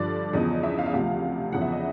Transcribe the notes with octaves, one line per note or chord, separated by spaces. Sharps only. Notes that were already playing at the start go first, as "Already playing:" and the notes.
Already playing: G2 D3 F3 D5
E2 C#3 F3 D#5
E5
F5
E5
D2 C3 F3 F5
E2 C#3 F3 F#5
E5
D#5